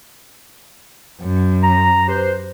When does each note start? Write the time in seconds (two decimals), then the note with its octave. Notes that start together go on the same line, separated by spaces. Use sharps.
1.21 F#2
1.62 A#5
2.07 G4 B4 C5